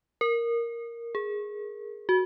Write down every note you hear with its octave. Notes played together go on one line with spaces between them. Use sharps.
A#4
G#4
F#4